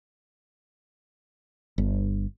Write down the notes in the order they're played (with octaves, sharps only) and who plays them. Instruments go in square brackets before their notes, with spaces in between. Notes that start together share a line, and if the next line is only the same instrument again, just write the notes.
[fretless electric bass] G1